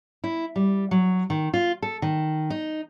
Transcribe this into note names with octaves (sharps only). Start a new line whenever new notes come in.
E4
G3
F#3
D#3
F4
A4
D#3
D#4